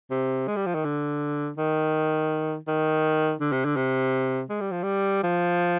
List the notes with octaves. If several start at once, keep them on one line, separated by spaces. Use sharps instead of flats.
C3
G#3
G3
F3
D#3
D3
D#3
D#3
D3
C3
D3
C3
G#3
G3
F3
G3
F3